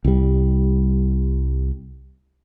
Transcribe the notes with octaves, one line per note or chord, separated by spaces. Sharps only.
C2 G3